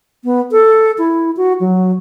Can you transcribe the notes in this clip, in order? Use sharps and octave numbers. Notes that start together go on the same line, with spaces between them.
B3
A4
E4
F#4
F#3